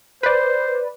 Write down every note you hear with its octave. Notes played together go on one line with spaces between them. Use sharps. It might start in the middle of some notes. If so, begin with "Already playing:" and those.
B4 C5 D5